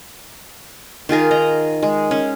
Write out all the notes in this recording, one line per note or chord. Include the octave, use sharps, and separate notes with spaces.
D#3 F4 G#4 A#4
D#5 A#5
G#3
C#4